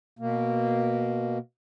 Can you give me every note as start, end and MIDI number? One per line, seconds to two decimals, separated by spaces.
0.19 1.38 47
0.19 1.38 58